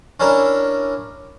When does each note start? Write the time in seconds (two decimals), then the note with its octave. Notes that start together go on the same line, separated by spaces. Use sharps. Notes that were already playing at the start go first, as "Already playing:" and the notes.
0.20 C#4 D4 E4 A#4